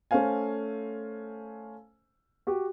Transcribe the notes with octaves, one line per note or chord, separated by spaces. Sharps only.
A3 C#4 A4 C5 F5 G#5
F#4 G4